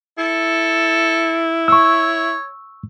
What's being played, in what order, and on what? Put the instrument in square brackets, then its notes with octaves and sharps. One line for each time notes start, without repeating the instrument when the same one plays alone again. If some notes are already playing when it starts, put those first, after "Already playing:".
[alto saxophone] E4 [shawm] A4
[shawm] C#5 [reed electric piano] C#6 E6